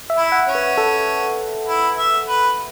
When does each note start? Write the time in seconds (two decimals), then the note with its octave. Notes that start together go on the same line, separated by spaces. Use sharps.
0.10 E5
0.17 E4
0.32 F#5
0.48 C#4
0.55 B4
0.78 A4
1.68 E4
1.98 E5
2.28 B4